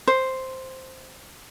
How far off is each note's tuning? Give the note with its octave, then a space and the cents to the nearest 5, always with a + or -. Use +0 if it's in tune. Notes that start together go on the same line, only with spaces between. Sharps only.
C5 +0